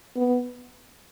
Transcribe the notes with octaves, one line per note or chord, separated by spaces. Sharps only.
B3